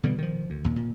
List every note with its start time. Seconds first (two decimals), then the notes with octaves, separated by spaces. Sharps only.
0.03 B2 D3 E3 G3
0.18 D#3 F3
0.50 D2
0.64 D#2 A#2
0.76 A#2